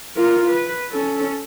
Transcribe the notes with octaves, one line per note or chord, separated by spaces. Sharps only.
F4 A#4
B4
C#4 A4